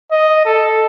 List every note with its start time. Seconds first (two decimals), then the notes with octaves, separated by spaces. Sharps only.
0.12 D#5
0.46 A4